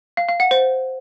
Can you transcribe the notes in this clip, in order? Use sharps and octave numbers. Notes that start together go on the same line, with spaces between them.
F5
F5
F#5
C5